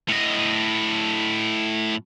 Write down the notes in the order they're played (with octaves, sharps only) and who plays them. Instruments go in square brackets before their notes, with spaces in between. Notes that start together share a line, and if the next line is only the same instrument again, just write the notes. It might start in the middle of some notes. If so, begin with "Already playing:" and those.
[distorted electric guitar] A2 D#5